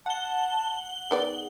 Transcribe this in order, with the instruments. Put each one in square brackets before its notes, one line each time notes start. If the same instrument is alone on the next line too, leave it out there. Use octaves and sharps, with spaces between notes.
[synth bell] F#5 G7 [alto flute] A5
[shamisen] D#3 B3 D5 [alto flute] G#4